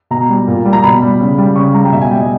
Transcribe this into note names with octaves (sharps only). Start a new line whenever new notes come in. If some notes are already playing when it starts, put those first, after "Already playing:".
B2 A#5
G3
A#2
G3
A#5
B2 B5
G3
C#3
G3
C#3 C#6
G3 A#5
G5
B2 E5
G#5
G3 G5
D#5